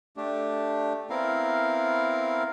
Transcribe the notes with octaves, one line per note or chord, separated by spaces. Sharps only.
A3 D4 G4
B3 C4 E4 A#4 F5